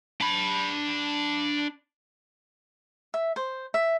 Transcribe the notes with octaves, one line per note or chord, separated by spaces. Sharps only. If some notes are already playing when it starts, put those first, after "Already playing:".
D4 B5
E5
C5
E5